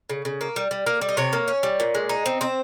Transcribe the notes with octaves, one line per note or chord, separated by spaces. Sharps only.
C#3
C#3
A#3
G3
G3
A#3
G3
D#5
C3 C#5
A#3
C#4
G3
A#2
G#3
D#4
C4
C4 C5